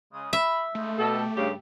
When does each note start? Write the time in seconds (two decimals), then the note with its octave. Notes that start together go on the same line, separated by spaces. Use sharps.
0.13 C#3 G#3 D#6
0.33 E5 B5
0.75 C#3 G#3 A3 D#4
0.99 B2 B3 G4 A4 G5 A5
1.37 G2 C#3 G4